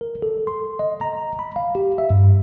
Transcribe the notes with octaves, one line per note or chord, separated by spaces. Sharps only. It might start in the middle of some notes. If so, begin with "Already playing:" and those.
A#4
A4
C6
D#5
A#5
B5
F5
G4
E5
G2